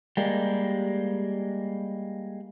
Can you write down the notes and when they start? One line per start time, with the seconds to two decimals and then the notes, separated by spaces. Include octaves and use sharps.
0.17 G3 G#3 A#3